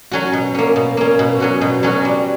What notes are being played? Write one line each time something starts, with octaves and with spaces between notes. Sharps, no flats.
F#3 C#4 F#4
B2
A#3 C#4
B2
A#3 C#4
B2
F#3 C#4 F#4
B2
F#3 C#4 F#4
G3